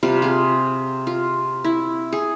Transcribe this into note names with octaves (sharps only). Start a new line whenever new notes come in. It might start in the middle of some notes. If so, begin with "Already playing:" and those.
C3 G3 F4
F4 G#4
F4
E4
G#4